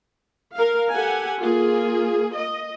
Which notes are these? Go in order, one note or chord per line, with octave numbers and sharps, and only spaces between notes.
A#4 F5
G4 A4 F#5 G#5
A#3 F4 G#4
D#5